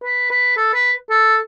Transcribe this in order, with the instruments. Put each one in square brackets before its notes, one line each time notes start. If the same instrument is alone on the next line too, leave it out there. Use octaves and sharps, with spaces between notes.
[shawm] B4
B4
A4
B4
A4